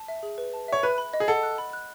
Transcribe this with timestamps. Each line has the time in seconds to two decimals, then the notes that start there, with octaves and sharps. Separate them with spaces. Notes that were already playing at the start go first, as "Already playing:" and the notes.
Already playing: A5
0.08 E5
0.23 G#4
0.38 B4
0.53 A5
0.68 C#5 E5
0.83 B4 F#6
0.98 B5
1.13 D#5
1.20 G#4
1.28 A4 F#5
1.43 F#6
1.58 B5
1.73 F#6